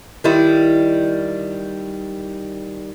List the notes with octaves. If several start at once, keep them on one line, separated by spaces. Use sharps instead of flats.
D#3 G3 E4